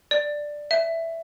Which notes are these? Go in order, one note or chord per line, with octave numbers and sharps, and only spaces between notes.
D5
E5